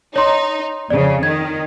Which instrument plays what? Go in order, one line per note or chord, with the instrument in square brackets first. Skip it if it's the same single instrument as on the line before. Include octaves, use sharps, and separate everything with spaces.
[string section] D#4 [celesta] C#5 C6
[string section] F2 C#3 [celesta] D5
[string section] D#3 [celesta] G#6